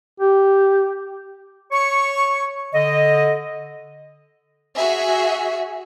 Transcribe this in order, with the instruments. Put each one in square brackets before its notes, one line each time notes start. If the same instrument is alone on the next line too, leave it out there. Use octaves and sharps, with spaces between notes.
[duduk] G4
[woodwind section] C#5 C#6
D3 D#5
[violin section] F#4 G#4 E5 G#5